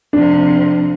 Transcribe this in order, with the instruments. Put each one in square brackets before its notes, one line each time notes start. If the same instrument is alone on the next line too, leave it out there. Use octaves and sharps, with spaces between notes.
[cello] F2 C3 [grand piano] D4